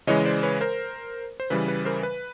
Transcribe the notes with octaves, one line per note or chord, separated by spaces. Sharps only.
C#3 E3 G#3 C#5 D#5
C5 D5
B4 C#5
A#4 C5
C5
C#3 E3 G3 B4
B4
A#4 C5
B4